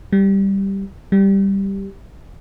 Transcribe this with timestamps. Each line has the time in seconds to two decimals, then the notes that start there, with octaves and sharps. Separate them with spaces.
0.13 G3
1.12 G3